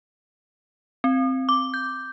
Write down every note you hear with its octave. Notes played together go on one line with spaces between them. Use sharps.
C4
D6
G6